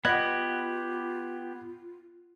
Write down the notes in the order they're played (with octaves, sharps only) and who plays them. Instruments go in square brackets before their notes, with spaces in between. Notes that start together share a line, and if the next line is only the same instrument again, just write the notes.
[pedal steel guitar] B3 G4 [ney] F4 [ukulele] D#5 F#5 [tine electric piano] B5 F#6 G#6